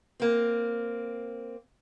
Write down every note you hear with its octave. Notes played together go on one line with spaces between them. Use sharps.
A#3 C4